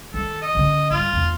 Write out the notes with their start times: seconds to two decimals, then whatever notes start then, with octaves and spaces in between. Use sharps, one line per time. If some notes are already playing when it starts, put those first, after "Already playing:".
0.14 D#3 A4
0.42 D#5
0.55 D3 C#4
0.91 G2 F4
1.13 E2